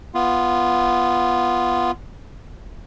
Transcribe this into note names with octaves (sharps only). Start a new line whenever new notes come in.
B3 F4